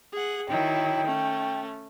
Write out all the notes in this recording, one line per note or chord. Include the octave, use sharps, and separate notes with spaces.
G#4 F#5
D#3 F#3 E4 G5
A3 C#4